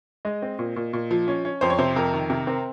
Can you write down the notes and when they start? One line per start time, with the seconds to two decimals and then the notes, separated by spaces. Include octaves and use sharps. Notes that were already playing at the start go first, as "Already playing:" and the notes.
0.25 G#3 D#5
0.42 C4
0.59 A#2
0.76 A#2
0.93 A#2
1.11 F3
1.28 C#4
1.45 C#4
1.61 F2 C5
1.70 C#5
1.78 C3 C5
1.96 F2 A#4
2.14 D#3
2.30 C3 A#4
2.47 C4 A#4